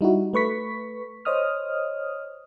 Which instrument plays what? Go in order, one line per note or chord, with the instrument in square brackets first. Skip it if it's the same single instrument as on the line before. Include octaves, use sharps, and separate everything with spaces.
[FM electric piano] G3 D#4 E4 F#4
A3 B4 C#6 B6
C5 C#5 D#5 D#6 F6